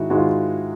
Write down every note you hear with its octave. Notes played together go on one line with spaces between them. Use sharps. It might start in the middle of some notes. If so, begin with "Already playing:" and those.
Already playing: G#2 D#3 G#3 E4 F#4
G#2 D#3 G#3 F#4
F4